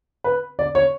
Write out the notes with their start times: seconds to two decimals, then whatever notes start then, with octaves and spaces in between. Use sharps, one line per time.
0.24 B4
0.59 D5
0.75 C#5